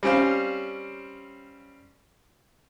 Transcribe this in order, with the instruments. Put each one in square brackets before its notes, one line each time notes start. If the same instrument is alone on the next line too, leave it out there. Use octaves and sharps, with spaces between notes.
[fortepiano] G3 C4 C#4 C5 F5